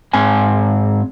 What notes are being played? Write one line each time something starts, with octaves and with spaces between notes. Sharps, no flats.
G#2 C4 G#5